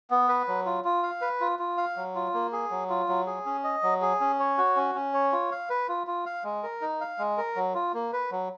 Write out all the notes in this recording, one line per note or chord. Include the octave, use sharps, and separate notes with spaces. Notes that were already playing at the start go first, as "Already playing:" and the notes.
B3
B4
F#3
F4
F4
F5
B4
F4
F4
F5
F#3
F4
A#3
G#4
F#3
F4
F#3
G#4
C#4
D#5
F#3
G#4
C#4
C#5
F#4
C#4
C#4
C#5
F4
F5
B4
F4
F4
F5
G#3
A#4
D#4
F5
G#3
A#4
F#3
F4
A#3
B4
F#3